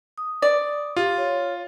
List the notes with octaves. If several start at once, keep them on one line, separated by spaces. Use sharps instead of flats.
D#6
D5
F4 G4
C#5